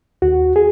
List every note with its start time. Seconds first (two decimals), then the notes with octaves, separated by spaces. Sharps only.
0.22 D#2 F#4
0.56 G#4